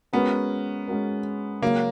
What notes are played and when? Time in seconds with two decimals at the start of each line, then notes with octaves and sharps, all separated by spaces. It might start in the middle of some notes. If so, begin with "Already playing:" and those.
0.13 G#3 B3 C#4 F#4 A#4
0.88 G#3 C#4 F#4 A#4
1.62 C#3 F#3 A#3 C#4 F#4 C#5